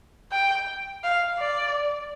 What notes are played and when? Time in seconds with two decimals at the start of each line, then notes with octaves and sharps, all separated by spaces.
0.32 G5
1.03 F5
1.39 D5